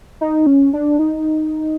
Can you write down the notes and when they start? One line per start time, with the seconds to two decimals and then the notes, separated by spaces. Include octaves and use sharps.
0.21 D#4
0.47 C#4
0.73 D4
0.99 D#4